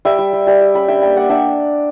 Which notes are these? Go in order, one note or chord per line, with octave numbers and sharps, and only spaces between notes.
G3 E5 G5
G3
G3
G3 E5 G5
G3
C#4 G5 B5
D4 E5 G5
A#3 E5 G5
A#3 D5 F#5
D4 E5 G5